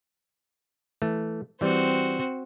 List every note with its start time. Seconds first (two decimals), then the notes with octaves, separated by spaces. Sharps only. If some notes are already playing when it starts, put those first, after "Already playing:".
1.02 E3 A3
1.61 E3 G3 C4 F#4